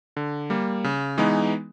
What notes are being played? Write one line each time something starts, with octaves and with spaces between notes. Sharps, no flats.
D3
G3 A#3
C#3
E3 G#3 B3 D#4